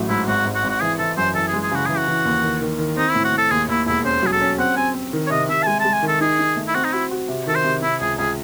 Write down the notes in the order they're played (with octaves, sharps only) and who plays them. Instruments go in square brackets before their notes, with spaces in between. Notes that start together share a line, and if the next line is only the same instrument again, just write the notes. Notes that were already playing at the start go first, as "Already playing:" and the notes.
Already playing: [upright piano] A1 F#3 A3
[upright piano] G#2 [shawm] E4
[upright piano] G#1 [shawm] F#4
[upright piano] G#1
[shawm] F#4
[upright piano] G#1
[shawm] F#4
[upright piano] E3 [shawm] G#4
[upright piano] E3 [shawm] A4
[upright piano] F#2 [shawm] C5
[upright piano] E3 [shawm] A4
[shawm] G#4
[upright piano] G#3
[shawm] G#4
[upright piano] C#3 [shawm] F#4
[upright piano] E3 [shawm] G#4
[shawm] F#4
[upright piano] E3
D#2
D#3
D#3
D#3
[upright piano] C4 [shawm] D#4
[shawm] E4
[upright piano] A2
[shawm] F#4
[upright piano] A2
[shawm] A4
[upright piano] D#2 [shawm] G#4
[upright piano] D#2 [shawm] E4
[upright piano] E1 [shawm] E4
[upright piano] C#4 [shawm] C5
[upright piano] F#3 [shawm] G#4
[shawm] A4
[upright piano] C#4
[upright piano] C4 [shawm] F#5
[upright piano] C4 [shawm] G#5
[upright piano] C4
D#3
[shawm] C#5
[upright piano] C3 [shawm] D#5
[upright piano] C3 [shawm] E5
[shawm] A5
[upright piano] G#3 [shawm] G#5
[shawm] A5
[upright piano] G#3
[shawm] G#5
[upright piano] D#3
[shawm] A4
[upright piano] D#4 [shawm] G#4
[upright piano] D#4
A3
[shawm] E4
[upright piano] C4 [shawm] F#4
[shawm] D#4
[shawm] E4 [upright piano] F#4
[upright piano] F#4
C3
[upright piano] D#3 [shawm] A4
[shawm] C5
[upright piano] C3
[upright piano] C3 [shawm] E4
[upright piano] C#2 [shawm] G#4
[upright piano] C#2 [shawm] G#4